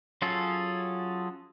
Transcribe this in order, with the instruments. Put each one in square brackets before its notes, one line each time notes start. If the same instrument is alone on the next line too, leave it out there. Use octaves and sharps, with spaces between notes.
[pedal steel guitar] F#3 C#4 F4 G#4 A4